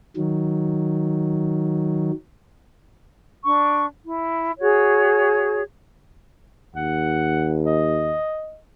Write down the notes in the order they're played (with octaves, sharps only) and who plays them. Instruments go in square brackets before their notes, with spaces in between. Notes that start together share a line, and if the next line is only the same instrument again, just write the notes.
[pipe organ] D#3 F#3
[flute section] D4 C#6
E4
F#4 G#4 C#5
[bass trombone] D#2 [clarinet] F#5
[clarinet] D#5